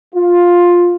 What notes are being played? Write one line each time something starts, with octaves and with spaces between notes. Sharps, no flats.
F4